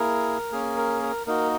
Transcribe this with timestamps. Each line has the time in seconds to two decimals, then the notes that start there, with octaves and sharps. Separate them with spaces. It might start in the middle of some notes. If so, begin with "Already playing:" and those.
Already playing: A#3 E4 G#4 A#4
0.52 A#3 C#4 G#4
0.77 A#4
1.02 A#4
1.27 A#3 D#4 F#4 A#4